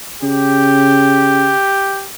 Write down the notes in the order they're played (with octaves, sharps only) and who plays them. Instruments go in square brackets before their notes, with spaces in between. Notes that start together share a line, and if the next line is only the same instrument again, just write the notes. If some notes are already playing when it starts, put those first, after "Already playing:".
[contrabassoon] C#3 [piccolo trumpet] G4